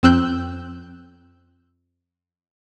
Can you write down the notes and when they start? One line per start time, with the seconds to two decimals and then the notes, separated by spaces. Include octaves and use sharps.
0.03 F2 C4 E6 F#6 G6